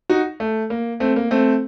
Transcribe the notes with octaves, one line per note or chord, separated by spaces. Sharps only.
D#4 F#4
A3
A#3
A3 C4
A#3
A3 C4